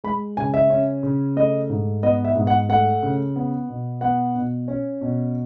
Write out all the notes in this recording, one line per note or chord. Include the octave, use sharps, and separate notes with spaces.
G#3 B5
C#3 G#5
E5
C#4
C#3
A3 D#5
G#2
B3 D#5
E5
G#2
F#5
A3 F#5
C#3
B3
B2
B3 F#5
B2
C#4
B2